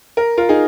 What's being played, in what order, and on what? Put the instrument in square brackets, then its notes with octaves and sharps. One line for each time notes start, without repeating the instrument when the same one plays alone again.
[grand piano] A#4
F4 A#4
D#4 G#4